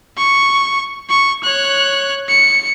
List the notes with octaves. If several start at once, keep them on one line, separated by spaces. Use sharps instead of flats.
C#6
C#6
C#5 F#6
C#7